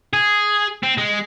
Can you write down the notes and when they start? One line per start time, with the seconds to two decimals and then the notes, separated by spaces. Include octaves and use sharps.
0.13 G#4
0.83 C4
0.98 G#3